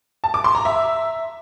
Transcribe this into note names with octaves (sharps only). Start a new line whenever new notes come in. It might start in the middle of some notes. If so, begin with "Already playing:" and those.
A5
D6
C6
A#5
E5